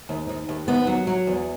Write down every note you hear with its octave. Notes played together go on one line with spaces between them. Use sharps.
D#2
D#2
D#2
D#2 B3
F#3
F#3
E2